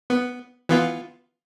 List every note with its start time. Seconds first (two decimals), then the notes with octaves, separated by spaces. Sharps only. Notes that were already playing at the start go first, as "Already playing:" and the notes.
0.10 B3
0.69 E3 B3 F4